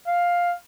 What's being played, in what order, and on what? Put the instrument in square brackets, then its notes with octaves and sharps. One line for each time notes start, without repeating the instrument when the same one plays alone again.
[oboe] F5